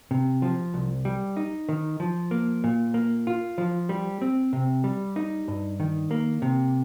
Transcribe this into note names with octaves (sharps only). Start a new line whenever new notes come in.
C3
F3
C2
G3
D#4
D#3
F3
A#3
A#2
A#3
F4
F3
G3
C4
C3
G3
D#4
G2
D#3
A#3
C3